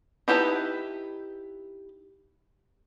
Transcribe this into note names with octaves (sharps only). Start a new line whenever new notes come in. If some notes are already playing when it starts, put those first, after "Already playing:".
D#4 E4 G4 B4 A5